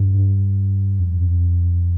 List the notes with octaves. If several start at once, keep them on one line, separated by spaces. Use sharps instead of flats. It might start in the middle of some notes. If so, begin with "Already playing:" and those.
Already playing: G2
F2